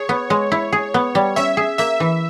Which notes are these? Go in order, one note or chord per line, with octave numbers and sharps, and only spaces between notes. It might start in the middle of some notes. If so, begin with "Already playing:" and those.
Already playing: G#4 C#5
B3
G#3
E4
G#4
B3
G3
C#4 E5
G#4
A#3 E5
E3